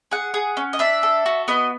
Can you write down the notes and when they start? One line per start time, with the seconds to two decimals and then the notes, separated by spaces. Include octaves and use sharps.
0.11 G#4 F#5
0.34 G#4
0.57 C#4
0.73 D#5
0.79 D4 E5
1.03 A4
1.26 F#4
1.48 B3 D#5